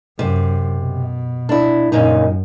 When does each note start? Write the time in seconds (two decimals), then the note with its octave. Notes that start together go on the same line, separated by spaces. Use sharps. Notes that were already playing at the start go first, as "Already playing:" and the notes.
0.19 F#2 C3
0.78 B2
1.49 D4 E4
1.92 F#2 A#2 C#3 D#4